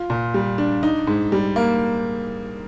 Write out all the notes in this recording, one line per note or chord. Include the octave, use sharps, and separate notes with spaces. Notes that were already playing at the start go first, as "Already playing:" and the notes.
Already playing: F4
A#2
G3
D4
D#4
G#2
G3
A#3